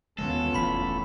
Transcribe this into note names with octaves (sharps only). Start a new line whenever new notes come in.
D#2 D3 G#3 B3 C#4 F4 A4
E1 A1 B5 B6